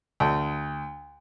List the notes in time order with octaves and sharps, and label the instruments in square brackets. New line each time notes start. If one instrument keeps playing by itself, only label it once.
[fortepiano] D2